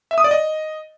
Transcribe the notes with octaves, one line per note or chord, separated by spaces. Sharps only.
E5
D#6
D5
D#5